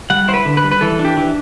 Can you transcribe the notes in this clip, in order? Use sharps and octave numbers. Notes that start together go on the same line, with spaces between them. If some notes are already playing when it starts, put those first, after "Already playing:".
G3 F#5
E4 C5
B4
D3
B4
G3
B4
E3 A4
D4
G4
E3